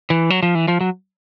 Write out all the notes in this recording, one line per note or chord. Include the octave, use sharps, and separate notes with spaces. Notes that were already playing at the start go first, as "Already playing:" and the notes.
E3
F#3
F3
E3
F3
F#3